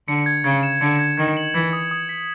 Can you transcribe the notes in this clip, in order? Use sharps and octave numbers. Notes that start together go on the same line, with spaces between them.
D3 C#7
G#6
C#3 G#6
E7
D3 C#7
G#6
D#3 G#6
F#7
E3 G#6
D#6
D#6
B6